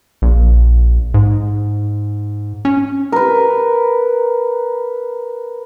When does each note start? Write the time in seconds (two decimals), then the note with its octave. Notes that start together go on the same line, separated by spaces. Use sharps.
0.22 A#1
1.14 G#2
2.65 C#4
3.12 A#4 B4